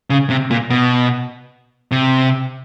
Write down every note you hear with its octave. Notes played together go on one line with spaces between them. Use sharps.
C#3
C3
A#2
B2
C3